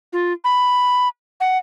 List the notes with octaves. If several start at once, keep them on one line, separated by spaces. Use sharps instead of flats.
F4
B5
F#5